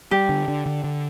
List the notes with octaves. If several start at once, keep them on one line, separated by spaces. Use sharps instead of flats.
G3 G4
D3
D3
D3
D3